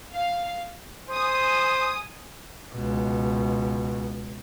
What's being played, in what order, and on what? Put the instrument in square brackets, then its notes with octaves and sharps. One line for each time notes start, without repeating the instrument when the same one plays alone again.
[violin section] F5
[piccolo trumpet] C5 [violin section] G#5 D#6
[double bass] C#2 B2